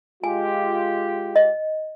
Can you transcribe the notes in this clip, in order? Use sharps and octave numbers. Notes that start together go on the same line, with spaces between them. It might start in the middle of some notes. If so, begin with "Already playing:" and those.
G#3 F4 G4 G#5
D#5